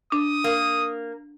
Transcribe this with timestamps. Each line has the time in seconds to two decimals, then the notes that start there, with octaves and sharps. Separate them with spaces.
0.12 D4 D#6
0.44 A#3